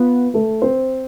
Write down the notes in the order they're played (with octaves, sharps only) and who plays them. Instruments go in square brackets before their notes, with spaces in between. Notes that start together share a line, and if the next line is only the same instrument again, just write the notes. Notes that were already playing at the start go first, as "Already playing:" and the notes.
Already playing: [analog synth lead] B3 [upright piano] F4
[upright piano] A3 A4
C4 C5